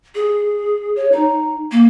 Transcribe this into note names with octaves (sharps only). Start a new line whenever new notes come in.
G#4
C#5
D#4
A#3